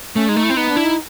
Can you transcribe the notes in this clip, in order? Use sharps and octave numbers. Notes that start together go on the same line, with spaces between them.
A3 C#4
G#3 D#4
A3
E4
C4
B3 D#4
D4
E4
D#4